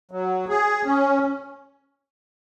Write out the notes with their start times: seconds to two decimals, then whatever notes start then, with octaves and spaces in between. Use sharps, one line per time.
0.11 F#3
0.48 G#4
0.85 C#4